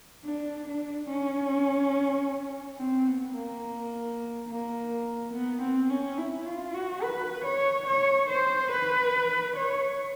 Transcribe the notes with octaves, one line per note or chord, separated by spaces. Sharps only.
D4
D4
C#4
C4
B3
A#3
A#3
B3
C4
C#4
E4
F4
F#4
B4
C#5
C#5
C5
B4
C#5